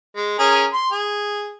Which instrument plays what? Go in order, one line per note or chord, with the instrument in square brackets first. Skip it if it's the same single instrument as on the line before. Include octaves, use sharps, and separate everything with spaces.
[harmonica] G#3
C#4 G#4 A#4
C6
G#4